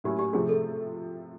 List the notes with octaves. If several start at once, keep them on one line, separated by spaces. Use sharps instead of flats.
A2 F#3 A#3 C#4 E4 G4
G4
C3 F3 A3 C4 G#4
A4